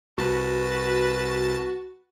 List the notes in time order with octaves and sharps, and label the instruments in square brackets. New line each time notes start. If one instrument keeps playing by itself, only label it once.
[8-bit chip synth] C2 A5 A6 [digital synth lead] F#4 [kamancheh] B4